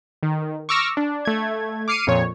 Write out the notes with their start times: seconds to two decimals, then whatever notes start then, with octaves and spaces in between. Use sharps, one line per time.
0.23 D#3
0.69 C#6 D6 E6 F6 A#6
0.97 D4
1.25 A3 G#6
1.88 D6 F6 C7 C#7 D#7
2.07 F2 A#2 C#5